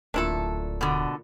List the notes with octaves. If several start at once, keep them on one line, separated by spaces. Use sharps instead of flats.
D1 A#2 A3 D4 E4 A4
B2 D3